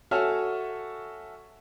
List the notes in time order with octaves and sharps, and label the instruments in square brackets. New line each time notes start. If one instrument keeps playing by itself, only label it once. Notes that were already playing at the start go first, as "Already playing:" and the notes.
[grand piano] F#4 A4 C#5 E5 G#5 F6